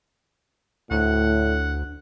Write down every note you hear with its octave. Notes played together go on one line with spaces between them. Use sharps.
D2 A2 F#5